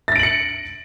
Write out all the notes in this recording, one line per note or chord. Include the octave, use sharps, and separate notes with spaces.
A6 A#6 C#7 D7 F#7